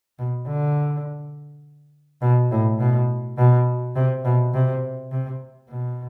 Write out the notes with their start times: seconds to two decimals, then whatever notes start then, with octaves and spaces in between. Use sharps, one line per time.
0.19 B2
0.47 D3
2.22 B2
2.51 A2
2.79 B2
3.38 B2
3.95 C3
4.24 B2
4.53 C3
5.11 C3
5.69 B2